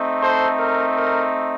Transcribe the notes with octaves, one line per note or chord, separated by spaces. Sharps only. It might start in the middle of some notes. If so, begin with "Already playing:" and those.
Already playing: A3 C4 D#4
A4 C5
A#4
A#4